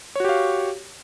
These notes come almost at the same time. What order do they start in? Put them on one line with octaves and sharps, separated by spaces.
C#5 F#4 G4 F5